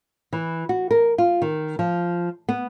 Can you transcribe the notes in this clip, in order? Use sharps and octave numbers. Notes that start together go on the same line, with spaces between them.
E3
F#4
A#4
F4
D#3
F3
B3